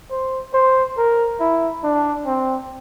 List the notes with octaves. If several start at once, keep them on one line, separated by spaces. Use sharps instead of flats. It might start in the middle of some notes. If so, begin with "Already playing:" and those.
C5
C5
A#4
E4
D4
C4